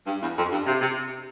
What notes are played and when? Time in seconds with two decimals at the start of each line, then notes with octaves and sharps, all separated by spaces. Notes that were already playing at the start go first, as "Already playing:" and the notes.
0.06 G2
0.21 E2
0.36 F2
0.50 G2
0.66 C3
0.80 C3